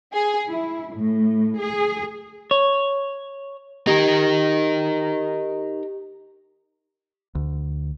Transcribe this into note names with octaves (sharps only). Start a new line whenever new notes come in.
G#4
E4
A2
G#4
C#5
D#4 G4 A#4
D2